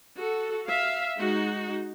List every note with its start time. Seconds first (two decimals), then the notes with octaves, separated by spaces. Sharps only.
0.17 F#4 A4
0.67 E5 F5
1.19 G#3 D#4 F#4